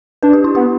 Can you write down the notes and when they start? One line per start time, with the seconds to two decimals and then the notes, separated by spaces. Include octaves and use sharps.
0.23 D4 B4
0.33 G4
0.44 E4
0.55 B3 G4